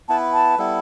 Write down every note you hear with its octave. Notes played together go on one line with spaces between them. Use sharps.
B3 E4 B4 A5
A5
G3 B3 E4 A4